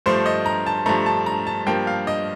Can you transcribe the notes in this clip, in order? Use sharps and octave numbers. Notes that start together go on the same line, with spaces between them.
G2 F3 A3 C5
D#5
A#5
A5
G2 F3 A3 A#5
A5
A#5
A5
G2 F3 A#3 G5
F5
D#5